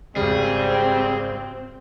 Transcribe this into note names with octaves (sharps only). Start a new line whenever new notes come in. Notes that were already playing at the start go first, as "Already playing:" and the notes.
G#1 C#3 G3 C4 G#4